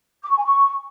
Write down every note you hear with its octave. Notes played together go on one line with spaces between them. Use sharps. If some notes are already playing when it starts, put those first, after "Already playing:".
D6
C#6
G#5
C#6